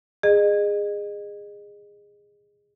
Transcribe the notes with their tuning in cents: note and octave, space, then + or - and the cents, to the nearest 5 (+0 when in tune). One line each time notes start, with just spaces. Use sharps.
G#4 -15 D#5 -30